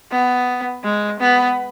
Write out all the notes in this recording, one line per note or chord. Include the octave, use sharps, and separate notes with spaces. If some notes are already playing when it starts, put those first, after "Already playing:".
B3
G#3
B3